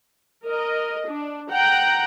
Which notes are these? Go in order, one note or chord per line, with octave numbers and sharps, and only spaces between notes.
A#4 D#5
D4
F#5 G5 A#5